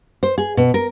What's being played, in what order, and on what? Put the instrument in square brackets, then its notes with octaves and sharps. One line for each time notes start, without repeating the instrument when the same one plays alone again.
[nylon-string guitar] C5
G#4
B2
A#4